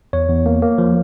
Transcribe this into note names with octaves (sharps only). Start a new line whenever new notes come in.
E2 C#5
E2
A#3
A#3
F3